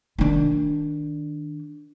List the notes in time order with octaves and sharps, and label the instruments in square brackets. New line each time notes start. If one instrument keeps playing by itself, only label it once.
[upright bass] D#3 D4